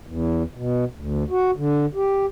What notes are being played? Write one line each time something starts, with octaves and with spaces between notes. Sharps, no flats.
E2
B2
D2
F#4
D3
G4